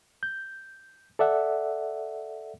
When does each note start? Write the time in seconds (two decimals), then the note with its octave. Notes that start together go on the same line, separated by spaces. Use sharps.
0.23 G6
1.19 A4 D5 E5 F#5